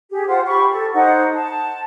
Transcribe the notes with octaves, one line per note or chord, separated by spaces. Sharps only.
G4 G#4
F4 C5 F#5
G4 B5 C#6
A4
D#4 C5 F#5
A5